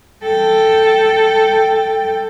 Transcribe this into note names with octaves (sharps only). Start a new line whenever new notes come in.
A4 G5